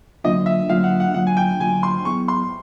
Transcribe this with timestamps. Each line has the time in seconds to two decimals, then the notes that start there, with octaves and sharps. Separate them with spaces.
0.24 D3 F#3 A#3 D4 F4 D#5
0.46 E5
0.69 D3 F#3 A#3 D4 F4 F5
0.84 F#5
1.00 F#5
1.14 D3 F#3 A#3 D4 F4 F#5
1.27 G#5
1.37 G5
1.60 D3 F#3 A#3 D4 F4 G#5
1.83 C6
2.05 F#3 B3 E4 G#4 C#6
2.28 C6